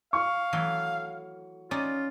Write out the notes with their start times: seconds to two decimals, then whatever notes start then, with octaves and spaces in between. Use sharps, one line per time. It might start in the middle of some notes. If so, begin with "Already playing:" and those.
0.13 F5 C#6
0.53 E3 F#3 A3
1.71 C#4 D#4 F4 D5